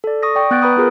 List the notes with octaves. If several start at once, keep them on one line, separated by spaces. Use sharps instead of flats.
A4 D5
C#6 D#6 A#6
D5 G5 C#6 D#6
B3 F#6 G6 A6 D7
B4 A#5 B5 D#6
B3 F4 G#4 A#4 B4